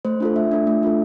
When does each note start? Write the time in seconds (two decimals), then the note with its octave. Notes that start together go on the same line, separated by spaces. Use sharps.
0.05 A3 C5
0.20 D4 F4 A4
0.36 A3 E5
0.51 D4 F4 A4
0.67 A3
0.83 D4 F4 A4